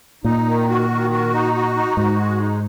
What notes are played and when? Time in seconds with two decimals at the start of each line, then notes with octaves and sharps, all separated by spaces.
0.24 A#2 D#4
0.47 D#3
0.68 F#4
0.90 D#3
1.10 F#4
1.33 D#4
1.54 F#4
1.76 D#4
1.97 G#2 F#4
2.18 G#3
2.40 D#4